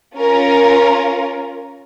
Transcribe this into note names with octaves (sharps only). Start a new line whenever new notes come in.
C#4 F4 A#4